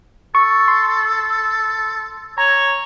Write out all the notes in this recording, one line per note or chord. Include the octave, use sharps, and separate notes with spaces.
A4 C#6
C6
C#5 A#5